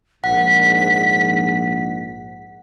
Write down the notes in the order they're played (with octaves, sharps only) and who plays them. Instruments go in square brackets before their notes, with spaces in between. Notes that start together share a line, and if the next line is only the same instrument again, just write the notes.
[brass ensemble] A#1 G#2 [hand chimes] F#5 [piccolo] B6